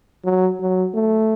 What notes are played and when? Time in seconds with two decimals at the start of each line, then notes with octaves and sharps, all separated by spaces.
0.25 F#3
0.60 F#3
0.95 A3